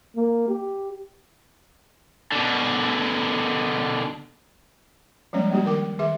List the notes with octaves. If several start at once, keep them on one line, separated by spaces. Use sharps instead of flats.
A#3
G4
B2 D3
F3 G3 G#3 A#3 C#4 C#5
G3 A#3 D4 F#4 G4
D#3 A#4 G5 D6
D#3 G#4 E5 D6